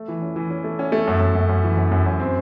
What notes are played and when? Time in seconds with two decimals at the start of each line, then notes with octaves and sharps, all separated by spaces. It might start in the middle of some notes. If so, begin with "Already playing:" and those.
Already playing: A3
0.08 E3
0.22 C#4
0.36 E3
0.50 C#4
0.64 A3
0.79 C#4
0.92 A3
1.08 F#2
1.21 F#2
1.35 F#2
1.49 F#2
1.64 E3
1.77 F#2
1.92 F#2
2.06 F#2
2.20 C4